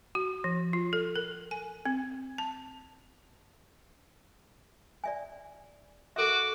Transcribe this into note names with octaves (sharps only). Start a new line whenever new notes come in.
F#4
F3
F4
A4
A#4
G#5
C4
A5
D5 E5 G#5
F#4 A4 A#4 E5 D6